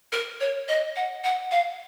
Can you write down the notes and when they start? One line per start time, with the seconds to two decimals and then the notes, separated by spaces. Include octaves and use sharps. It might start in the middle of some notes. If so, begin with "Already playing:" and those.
0.12 A#4
0.40 C#5
0.68 D#5
0.96 F#5
1.24 F#5
1.51 F5